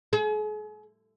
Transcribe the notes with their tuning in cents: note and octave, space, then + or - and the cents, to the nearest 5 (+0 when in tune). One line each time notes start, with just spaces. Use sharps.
G#4 +40